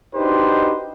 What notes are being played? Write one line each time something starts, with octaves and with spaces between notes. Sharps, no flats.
D4 D#4 F#4 G4 B4 C5